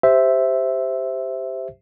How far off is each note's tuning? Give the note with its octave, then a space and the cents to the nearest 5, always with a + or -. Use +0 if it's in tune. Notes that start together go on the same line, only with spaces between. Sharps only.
G4 +0 C5 -5 E5 +0